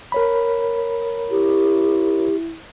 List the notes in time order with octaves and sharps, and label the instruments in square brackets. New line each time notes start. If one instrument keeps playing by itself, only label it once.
[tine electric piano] A#4 C#5 B5
[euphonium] E4 [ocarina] G4